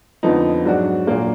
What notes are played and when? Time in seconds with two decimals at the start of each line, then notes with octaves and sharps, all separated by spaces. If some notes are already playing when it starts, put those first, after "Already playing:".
0.23 F2 D3 F3 B3 D#4
0.65 G#2 F#3 D4 F#4
1.07 A#2 F#3 A#3 D4